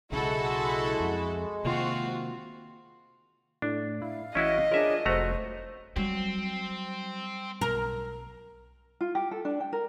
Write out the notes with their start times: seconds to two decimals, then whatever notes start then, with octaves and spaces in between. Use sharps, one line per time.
0.12 B1 C#3 G#3 E4 F#4 A4
1.00 F2
1.65 C3 D#3 A#3 C4 F4 F#4
3.62 A2 D4
4.02 E4 F5
4.35 A1 C#4 E4 F#4 D#5
4.72 D4 F4 G#4 A#4 C#5 E5
5.06 F1 A3 F#4 C5 A#5
5.96 F#3 G3 C4
7.61 B1 A#4
9.01 F4
9.15 G4
9.31 A4
9.45 D4
9.60 G5
9.73 A#4